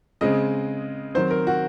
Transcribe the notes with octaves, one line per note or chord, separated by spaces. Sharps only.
C#3 G#3 C4 D#5
D#3 F#3 C4 C5
A#4
F#4